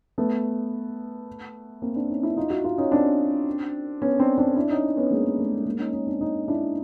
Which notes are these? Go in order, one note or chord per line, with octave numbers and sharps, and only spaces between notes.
A3 B3
A#3 C4
C4 D4
C#4 D#4
D4 E4
D#4 F4
E4 F#4
D#4 F4
C#4 D#4
C4 D4
B3 C#4
C4 D4
C4 D4
D4 E4
C#4 D#4
B3 C#4
G#3 A#3
G#3
A3
G#3 A#3
G#3 A#3
C#4 D#4
C#4 D#4
C4 D4
C#4 D#4
D4 E4